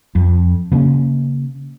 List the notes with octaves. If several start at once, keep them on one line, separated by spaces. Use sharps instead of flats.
F2
C#3 A#3 C4 C#4